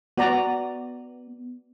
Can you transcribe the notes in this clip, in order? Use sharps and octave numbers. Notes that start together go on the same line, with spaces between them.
B3 F#4 D5 A#5